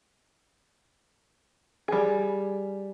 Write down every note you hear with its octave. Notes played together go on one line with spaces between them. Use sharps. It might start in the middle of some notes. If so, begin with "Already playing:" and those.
G3 G#4